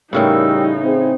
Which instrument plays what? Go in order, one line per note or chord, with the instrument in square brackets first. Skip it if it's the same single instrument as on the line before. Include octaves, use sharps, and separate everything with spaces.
[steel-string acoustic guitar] A2 C#3 E3 [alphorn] G3 [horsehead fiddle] D#4 [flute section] A#4 G5 E6
[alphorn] C4 [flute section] G#4